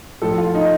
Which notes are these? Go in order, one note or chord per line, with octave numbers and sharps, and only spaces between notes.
A2 F3 A4
F4
D#4